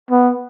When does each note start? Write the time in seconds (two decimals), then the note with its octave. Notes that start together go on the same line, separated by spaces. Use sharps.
0.11 B3